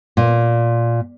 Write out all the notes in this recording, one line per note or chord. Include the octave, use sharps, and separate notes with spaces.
A#2